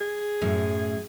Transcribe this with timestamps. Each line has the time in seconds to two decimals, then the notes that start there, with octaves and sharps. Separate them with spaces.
0.01 G#4
0.41 F#2 A2